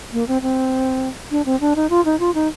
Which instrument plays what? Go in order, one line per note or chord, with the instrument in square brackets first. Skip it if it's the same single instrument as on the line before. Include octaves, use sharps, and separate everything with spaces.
[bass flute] A#3
C4
C4
D4
C4
D4
D#4
F4
D#4
F4
D#4